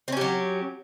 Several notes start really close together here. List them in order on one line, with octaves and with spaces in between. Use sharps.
C4 C#4 G4 F#3